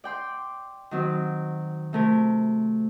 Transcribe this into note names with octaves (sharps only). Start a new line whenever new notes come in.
D5 G5 C6
D#3 F#3 C4
C3 A3 A#4